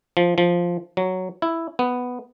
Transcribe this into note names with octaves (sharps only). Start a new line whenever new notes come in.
F3
F3
F#3
E4
B3